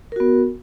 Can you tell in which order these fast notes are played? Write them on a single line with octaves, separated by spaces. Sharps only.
A#4 F#4 B3